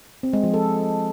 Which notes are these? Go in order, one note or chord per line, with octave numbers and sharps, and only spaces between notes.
C4
G#3
F3
A4